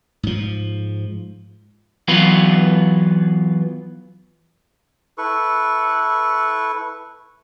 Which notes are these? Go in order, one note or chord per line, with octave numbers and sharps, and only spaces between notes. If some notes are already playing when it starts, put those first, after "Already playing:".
G#2 F3
E3 F#3 B3 F4 B4
E4 A4 B4 C#6